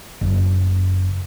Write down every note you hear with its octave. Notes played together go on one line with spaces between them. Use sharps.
F#1